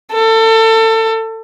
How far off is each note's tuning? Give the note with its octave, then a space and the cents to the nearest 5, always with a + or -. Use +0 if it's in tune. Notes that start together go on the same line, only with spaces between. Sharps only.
A4 +30